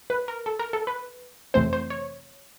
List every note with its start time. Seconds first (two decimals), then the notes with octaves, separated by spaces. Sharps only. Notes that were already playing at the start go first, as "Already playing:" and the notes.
0.10 B4
0.28 A#4
0.46 A4
0.59 A#4
0.73 A4
0.87 B4
1.54 F2 C3 E3 A3 C4 C5
1.73 C5
1.90 C#5